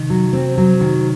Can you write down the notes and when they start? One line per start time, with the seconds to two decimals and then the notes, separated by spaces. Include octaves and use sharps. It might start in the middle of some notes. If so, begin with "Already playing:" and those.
Already playing: C3 D#3
0.10 F#3
0.33 C4
0.57 F#3
0.81 D#3